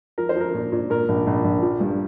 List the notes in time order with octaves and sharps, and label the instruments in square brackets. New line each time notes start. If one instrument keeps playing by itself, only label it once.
[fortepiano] F3 A#4
C5
F3 A#4
A#2
A#2
A#2 A#4
A#1
A#1
A#1
F3
G2